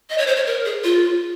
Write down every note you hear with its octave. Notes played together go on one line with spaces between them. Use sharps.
D#5
C#5
C5
C#5
A#4
G#4
F4